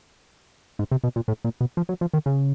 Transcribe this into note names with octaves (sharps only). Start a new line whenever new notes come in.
G#2
C3
B2
A#2
A2
A#2
B2
F3
F#3
F3
D#3
C#3